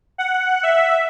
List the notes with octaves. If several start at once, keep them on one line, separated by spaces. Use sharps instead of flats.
F#5
E5